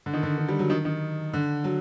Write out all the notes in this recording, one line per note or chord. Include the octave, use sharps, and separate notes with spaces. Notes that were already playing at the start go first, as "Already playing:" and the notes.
D3
D#3
D3
D#3
G3
F#3
D#3
D#3
D3
F#3